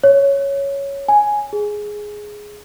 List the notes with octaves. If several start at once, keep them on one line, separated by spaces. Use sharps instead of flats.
C#5
G#5
G#4